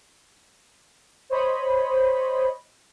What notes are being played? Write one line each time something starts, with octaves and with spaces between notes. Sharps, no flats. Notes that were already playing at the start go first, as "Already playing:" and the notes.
C5 C#5 D#5 B5